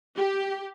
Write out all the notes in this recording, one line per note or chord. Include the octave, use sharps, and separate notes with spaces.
G4